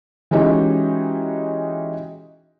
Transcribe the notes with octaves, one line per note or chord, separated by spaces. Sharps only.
E3 G#3 C#4 D#4 F#4 G4